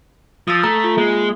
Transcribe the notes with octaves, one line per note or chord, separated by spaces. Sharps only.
F3 D#6 E6 A6
A3 A#5
F4
G#3 A#3